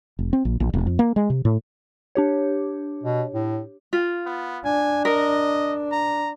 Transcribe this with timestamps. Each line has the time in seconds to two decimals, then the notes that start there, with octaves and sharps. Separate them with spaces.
0.19 F1
0.33 C4
0.45 A#1
0.60 A#1
0.73 E1
0.87 F2
0.99 A#3
1.16 G#3
1.30 C3
1.45 A2
2.15 D4 G4 C#5
3.03 B2
3.34 A2
3.93 F4
4.26 B3
4.65 D4 G#5
5.05 A#4 D#5
5.92 A#5